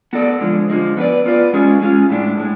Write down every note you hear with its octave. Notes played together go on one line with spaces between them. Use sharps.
B3 F#4 A4 D5
D3 F3 G#3
D3 F3 G#3
B3 F4 B4 D5
B3 F4 B4 D5
G#3 C#4 F4 G#4
G#3 C#4 F4 G#4
A2 G#3 D4
A2 G#3